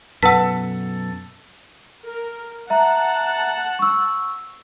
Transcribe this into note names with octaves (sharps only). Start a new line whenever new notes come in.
F#2 B2 A4 B4 F#5 E6 B6
A#4
E5 F#5 A5 A#5
C#6 E6